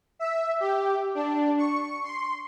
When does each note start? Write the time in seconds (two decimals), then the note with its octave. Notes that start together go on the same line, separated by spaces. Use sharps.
0.19 E5
0.60 G4
1.15 D4
1.58 C#6
2.04 C6